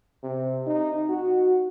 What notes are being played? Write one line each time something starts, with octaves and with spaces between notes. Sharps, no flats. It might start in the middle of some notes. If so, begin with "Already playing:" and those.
C3
D#4
F#4